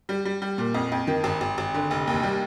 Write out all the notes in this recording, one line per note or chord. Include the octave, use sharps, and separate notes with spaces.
G3
G3
G3
A#2
F2
F2
D#3
G#1
G#1
G#1
D3
F1
D#2
G3